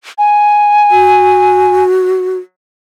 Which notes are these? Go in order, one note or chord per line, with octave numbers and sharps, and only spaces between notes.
G#5
F#4